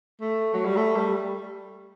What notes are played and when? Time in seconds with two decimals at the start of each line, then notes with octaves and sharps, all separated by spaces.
0.21 A3
0.53 F#3
0.65 G3
0.77 A3
0.96 G3